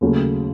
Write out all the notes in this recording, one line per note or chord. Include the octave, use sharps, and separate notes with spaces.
D#2 C#3 F#3 A3